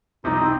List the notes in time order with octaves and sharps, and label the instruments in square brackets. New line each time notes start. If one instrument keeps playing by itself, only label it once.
[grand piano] C2 C3 F3 [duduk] D#4
[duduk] C4